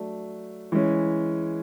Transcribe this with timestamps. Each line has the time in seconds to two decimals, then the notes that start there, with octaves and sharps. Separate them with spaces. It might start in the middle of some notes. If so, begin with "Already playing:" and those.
Already playing: F#3 A3 D4
0.72 E3 G#3 C#4